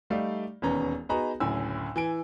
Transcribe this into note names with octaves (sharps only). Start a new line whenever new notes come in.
G3 A3 D#4 D5 F5
E1 D#2 B3 C#4 A#5
B3 D#4 F#4 G#4 B4 A#5
F#1 D2 A2 C#4 G#5 E6
E3 G#5 D7